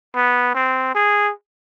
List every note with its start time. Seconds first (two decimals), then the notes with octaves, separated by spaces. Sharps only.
0.16 B3
0.55 C4
0.95 G#4